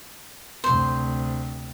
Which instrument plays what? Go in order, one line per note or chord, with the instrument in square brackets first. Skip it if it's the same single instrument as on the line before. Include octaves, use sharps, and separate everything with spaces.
[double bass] D2 C3 [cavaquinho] C5